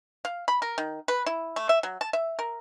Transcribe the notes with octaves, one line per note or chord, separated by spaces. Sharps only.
F5
B5
A#4
D#3
B4
E4
A3
E5
F#3
A5
E5
A#4